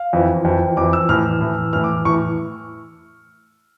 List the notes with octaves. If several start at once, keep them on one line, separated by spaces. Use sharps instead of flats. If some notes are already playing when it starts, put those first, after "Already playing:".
Already playing: F5
F2 E3
F2 E3 G5
F2 E3 D6
E6
A2 E3 F6
A2 E3
A2 E3 F6
D6
A2 E3 C#6